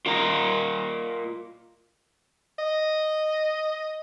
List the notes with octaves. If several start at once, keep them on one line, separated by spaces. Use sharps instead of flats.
F4 A#4 D#5 A#5
D#5